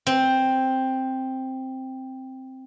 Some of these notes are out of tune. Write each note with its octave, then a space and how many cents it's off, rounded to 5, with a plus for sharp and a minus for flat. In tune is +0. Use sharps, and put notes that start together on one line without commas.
C4 +5